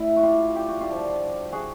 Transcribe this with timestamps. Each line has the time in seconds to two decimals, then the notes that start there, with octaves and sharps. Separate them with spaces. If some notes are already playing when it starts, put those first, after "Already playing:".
Already playing: A2 E4
0.16 F#4
0.23 F4 G4
0.55 G4
0.68 F#4
0.81 F4 G4
0.88 G2 D3 F3
1.52 F#4 G#4